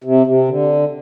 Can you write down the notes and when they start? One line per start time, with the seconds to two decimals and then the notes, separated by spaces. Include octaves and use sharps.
0.04 C3
0.27 C3
0.48 D3